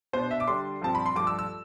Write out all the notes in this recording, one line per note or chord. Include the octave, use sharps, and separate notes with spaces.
B2 B3 D4 C5
E5
D6
D3 G3 D4 C6
G2 F3 C4 A5
B5
C6
G2 F3 A3 D6
E6
E6